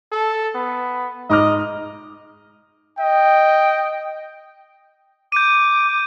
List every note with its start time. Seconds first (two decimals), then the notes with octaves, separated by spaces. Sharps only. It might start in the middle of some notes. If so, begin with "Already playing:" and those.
0.12 A4
0.55 B3
1.30 G#2 D#5 D6 F6
2.99 D#5 G5
5.32 D6 G6 D#7